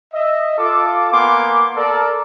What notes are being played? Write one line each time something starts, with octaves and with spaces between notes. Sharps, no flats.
D#5 E5
F4 A4 D6
A#3 B3 F5 G#5 C6 D6
A4 A#4 D5